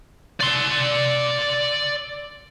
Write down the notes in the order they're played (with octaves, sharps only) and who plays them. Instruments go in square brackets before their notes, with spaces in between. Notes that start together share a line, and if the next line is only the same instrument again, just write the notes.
[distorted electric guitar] D5 C6